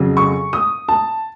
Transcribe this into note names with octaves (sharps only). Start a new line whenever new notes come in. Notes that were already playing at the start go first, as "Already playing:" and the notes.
Already playing: F2 C#3 F#3
C#6
D#6
A5